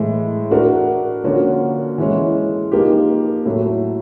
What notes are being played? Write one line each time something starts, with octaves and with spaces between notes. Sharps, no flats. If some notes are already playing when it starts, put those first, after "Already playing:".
Already playing: A2 E3 G#3
A3 D4 F#4 A#4
D3 F3 A#3 C#4 F#4
E3 G#3 C#4
F3 A#3 D#4 G4
A2 F#3 A3